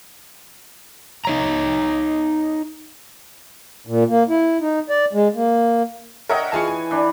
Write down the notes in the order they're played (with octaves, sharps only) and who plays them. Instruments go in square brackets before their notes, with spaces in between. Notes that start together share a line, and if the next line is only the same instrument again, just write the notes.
[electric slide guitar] D#4 C#5 A#5
[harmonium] A#2
A#3
E4
D#4
D5
G#3
A#3
[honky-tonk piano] A#4 E5 F#5 [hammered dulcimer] C#5 D#5 G5
[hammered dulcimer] E3 C#6 [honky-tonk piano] F4 G#4 A5
[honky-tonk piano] G#5
[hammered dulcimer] E3 D4 B5